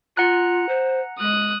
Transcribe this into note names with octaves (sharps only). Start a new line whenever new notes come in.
F4 F#5 A#5 F#6
C5
G#3 D#6 F#6